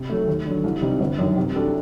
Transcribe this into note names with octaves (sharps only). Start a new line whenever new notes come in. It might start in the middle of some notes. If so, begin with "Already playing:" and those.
Already playing: C3
F#3 A3
D#2
D3 F#3
C2
C3 G3 C4 D#4
G1
F#2 D#3
C3
G3 D4 F#4 A4